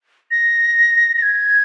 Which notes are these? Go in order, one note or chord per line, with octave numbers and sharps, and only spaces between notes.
A#6
A#6
G#6